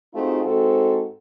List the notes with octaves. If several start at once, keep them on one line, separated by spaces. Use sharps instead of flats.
A3 C4 D#4 F4 F#4 G#4
G#2 C4 F#4 A4